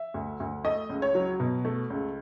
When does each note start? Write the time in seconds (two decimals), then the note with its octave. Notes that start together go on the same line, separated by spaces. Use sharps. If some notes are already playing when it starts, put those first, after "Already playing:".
Already playing: E5
0.14 D2
0.40 D2
0.64 A3 D#5
0.89 C#2
1.02 C#5
1.15 F#3
1.40 B2
1.65 A3
1.90 C#2